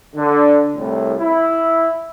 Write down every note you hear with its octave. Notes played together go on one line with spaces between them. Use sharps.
D3
C2 A2
E4